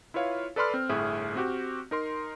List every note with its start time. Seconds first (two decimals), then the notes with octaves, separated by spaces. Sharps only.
0.14 E4 F4 B4 C#5 F5
0.56 A4 B4 D5 B5 C6 F6
0.74 C4
0.89 G1 A2 G#4 E5
1.36 C4 F#4 G4
1.91 D#4 A#4 C6